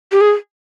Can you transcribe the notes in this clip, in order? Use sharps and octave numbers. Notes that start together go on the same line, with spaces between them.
G4
G#4